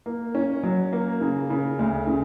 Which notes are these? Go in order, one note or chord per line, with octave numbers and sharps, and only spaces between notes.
A#3
C#4
F#3
A#3
C#3
C#3
D2
C#3